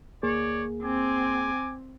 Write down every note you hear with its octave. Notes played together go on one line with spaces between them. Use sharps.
D2 A#3 G#4 C#5 D5
C4 G#5 D6